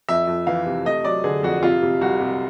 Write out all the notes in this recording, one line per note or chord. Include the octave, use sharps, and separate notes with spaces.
F2 E5
F2
E3 F5
C3
A3 D#5
F#3 D5
D3 G#4
F2 F#4
C3 F4
C3
C2 F#4
C3